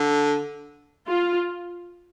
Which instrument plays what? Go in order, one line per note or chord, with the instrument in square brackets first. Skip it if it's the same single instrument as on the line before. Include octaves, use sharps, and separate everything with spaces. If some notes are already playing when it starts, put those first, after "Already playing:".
Already playing: [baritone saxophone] D3
[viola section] F4